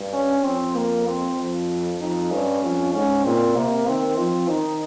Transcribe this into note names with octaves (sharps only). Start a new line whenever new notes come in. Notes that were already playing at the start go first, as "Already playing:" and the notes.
Already playing: G2
C#4
F2 C4
A#3
C4
F2
F2 D#4
G2 C#4
F2
G#2 C#4
A#2 C4
C3 A#3
D#3 C4
F3 C4
D#3 D#4